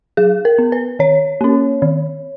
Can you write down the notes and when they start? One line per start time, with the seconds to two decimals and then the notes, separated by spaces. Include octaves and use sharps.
0.17 F#3 G#4
0.45 A#4
0.58 B3
0.72 B4
0.99 D#3 C#5
1.41 A#3 C#4
1.82 D#3